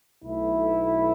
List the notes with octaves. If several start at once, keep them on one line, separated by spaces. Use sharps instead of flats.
B1 B2 A3 E4